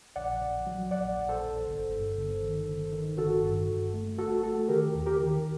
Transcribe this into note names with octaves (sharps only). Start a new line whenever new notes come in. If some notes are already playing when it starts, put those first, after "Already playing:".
A#1 D5 F#5
A#1
F#3
A#1 D5 F#5
A#1
A4 C5
A#1
G1
G2
G1
D#3
G1
D#3
G1 F#4 A4
G2
G2
A3
G1 F#4 A4
A3 F#4 A4
D#3 G4 A#4
D#2
G4 A#4
D#3